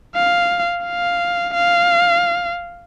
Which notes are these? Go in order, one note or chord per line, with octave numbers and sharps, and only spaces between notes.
F5
F5
F5